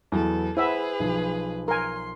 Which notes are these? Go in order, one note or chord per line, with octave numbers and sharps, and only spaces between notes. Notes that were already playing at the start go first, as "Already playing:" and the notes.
E2 F#3 B3 A4
E4 G#4 B4 C5 E5 F#5
B1 F3
A#4 G#5 C6